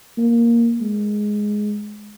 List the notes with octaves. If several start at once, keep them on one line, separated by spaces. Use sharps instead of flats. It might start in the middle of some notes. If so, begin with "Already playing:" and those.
A#3
G#3